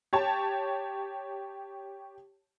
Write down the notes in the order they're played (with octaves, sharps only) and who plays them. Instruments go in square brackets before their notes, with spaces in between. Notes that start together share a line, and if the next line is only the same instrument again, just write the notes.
[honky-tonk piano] G4 C#5 A5